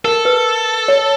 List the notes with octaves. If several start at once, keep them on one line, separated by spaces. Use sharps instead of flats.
A4 A#4
B4
C#5